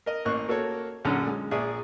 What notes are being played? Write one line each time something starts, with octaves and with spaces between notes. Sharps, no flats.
A#4 D#5
A1 A#3 D#5 C#6 F#6
A#3 F#4 A4 A#4 C#5
A#1 F#2 D3 C#4 A#5
G#3
A#1 G#4 D5 E5 D#6